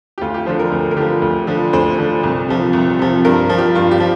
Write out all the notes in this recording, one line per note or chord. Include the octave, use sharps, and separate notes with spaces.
G4
D2 F4
G4
D3 F3 C5
A#4
D2
A#4
D3 F3 G4
D2
D3 F3
D2 C5
D3 F3
C2
C3 F3
C2
C3 F3
G2 A#4
F3
G4
G2 F4
G4
F3